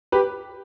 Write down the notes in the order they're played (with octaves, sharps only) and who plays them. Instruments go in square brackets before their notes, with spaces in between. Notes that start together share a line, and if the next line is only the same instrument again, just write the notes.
[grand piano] G4 B4